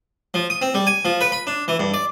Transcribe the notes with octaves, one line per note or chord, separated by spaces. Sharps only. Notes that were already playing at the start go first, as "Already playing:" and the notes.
F3
D#6
C4
G3
G#5
F3
B4
B5
D4
E3
G2
D5